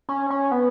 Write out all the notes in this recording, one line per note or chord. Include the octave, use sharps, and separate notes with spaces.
C#4
C#4
B3